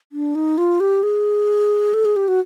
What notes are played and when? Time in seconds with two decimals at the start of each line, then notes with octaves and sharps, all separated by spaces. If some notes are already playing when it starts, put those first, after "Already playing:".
0.12 D4
0.35 D#4
0.58 F4
0.80 G4
1.03 G#4
1.94 A4
2.05 G#4
2.16 G4
2.28 F#4